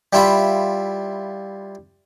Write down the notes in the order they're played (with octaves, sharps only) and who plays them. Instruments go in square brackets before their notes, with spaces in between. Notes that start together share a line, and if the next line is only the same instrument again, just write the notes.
[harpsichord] G3 E4 F4 B5